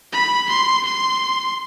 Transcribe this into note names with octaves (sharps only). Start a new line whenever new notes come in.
B5
C6
C6